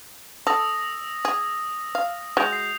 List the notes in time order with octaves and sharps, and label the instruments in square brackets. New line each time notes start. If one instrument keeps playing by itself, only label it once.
[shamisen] A4 [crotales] D#6 E6 A#6
[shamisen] G#4
F5
[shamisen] G#3 F#4 [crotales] G6 F7
[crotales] C7